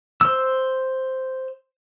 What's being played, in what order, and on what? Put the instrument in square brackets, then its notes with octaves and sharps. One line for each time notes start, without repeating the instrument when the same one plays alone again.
[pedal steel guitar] C5 E6